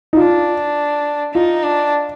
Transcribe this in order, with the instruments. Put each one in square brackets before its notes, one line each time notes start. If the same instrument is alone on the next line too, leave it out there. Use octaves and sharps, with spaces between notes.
[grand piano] D#4
[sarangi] D4 [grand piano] F4
[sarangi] D#4 [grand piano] F4
[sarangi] D4